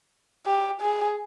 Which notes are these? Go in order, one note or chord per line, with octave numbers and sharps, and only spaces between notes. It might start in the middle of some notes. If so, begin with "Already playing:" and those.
G4
G#4